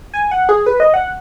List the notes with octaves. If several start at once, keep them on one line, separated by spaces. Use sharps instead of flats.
G#5
F#5
G#4
B4
D#5
F#5